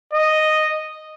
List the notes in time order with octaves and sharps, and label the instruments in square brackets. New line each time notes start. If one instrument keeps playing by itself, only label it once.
[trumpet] D#5